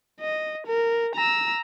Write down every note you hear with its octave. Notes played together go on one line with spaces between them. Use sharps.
D#5
A#4
A#5 E6